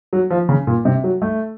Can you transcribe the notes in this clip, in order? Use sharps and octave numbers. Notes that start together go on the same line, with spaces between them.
F#3
F3
C#3
A#2
C3
F#3
A3